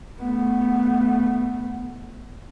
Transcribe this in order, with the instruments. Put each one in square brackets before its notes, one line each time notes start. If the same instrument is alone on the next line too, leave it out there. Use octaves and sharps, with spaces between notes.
[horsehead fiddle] A3 B3